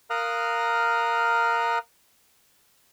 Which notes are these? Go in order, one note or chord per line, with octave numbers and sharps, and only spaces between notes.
A#4 F5 A#5 D#6 F6 F#6